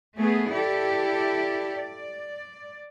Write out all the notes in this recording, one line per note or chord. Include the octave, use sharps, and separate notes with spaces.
A3 B3 G#4
E4 G4 A4 D5
D5